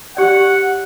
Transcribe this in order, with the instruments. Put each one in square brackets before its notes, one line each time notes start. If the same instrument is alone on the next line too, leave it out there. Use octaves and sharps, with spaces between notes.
[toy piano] G4 D5 [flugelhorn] F#5